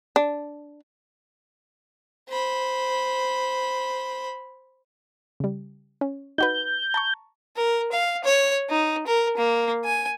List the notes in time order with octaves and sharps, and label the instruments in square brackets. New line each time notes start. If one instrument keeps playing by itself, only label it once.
[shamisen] D4
[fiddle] C5 B5
[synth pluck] C#3 G3
C#4
[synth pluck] D#4 F#4 B4 [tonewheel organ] G6
[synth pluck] A5 A#5 C#6
[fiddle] A#4
F5
C#5
D#4
A#4
A#3
G#5